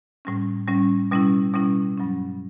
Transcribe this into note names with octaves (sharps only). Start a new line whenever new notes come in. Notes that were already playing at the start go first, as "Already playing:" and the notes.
A2 G3 C#4
A2 G3 C#4
B2 G3 C#4 E4
B2 G3 C#4 E4
G2 F#3 C#4